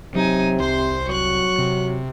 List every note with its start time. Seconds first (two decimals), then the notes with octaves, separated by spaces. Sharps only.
0.15 C3 F#3 D#4 G#5
0.60 C2 C5 C6
1.08 F#3 C#6 F#6
1.59 C3